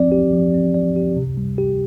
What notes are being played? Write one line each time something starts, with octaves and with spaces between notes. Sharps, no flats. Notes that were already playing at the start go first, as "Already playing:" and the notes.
Already playing: F3 C4 D5
G4
F3
C4
D5
G4
C3
G3
G4